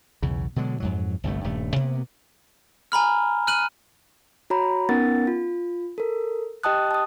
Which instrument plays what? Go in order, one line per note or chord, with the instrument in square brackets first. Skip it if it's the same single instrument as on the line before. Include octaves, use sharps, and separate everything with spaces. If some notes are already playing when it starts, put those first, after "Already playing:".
[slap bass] B1 E2 C#3
B2 D3 F#3 G#3
F2 G#2 F#3
G1 C2 G2 A3
D#1 G2 A3
B2 A#3 B3
[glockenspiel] G#5 A#5 B5 F6
F6 F#6 D#7 F#7
[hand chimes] F#4 C#5 A#5 B5
B3 C#4 D#4 A#4 F#5 A6
F4
A4 A#4
G4 D#5 G5 A5 D#6 F#6
A5 D#6